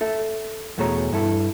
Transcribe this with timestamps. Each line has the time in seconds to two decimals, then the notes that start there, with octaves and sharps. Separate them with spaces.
0.01 A4 E5
0.78 E2 B2 A3 G#4 C#5 A#5
1.12 G2 E4 A4